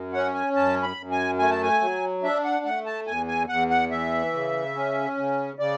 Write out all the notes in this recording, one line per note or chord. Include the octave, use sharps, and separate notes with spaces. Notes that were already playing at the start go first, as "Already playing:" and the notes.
Already playing: F#2
C#4 F#5
G#5
F#2 A5
B5
F#2
G#5
A3 G#5
A5
G#5
F#3
D4 E5
F#5
A3 F#5
A5
E2 G#5
G#5
E2 F#5
F#5
E3 E5
C#3
C#4
C#3
C#3 D5